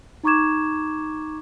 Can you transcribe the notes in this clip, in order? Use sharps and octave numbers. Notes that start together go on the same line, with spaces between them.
D#4 A#5 C#6 D6 G#6 E7